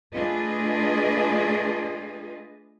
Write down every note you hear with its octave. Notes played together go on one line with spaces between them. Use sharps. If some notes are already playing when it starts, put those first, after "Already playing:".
A3 D4 F4 G#4 B4 D#5